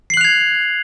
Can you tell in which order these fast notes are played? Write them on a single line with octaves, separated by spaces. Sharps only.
C7 F#7 F#6 F7 G#6